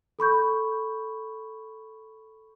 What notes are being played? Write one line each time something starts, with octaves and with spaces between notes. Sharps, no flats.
A4 B5 C#6 G6